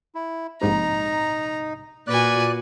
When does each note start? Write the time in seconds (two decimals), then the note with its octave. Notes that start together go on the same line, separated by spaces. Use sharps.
0.15 E4
0.61 A#1 G#2 C3 D#4 A#5
2.07 A#2 F4 F#4 B4 D5 G#5 F#6